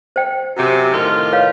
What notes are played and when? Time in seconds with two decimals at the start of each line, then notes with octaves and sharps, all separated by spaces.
0.16 C5 G5
0.57 F#2 C3
0.91 A2 D#3 F4
1.32 B4 C#5 F5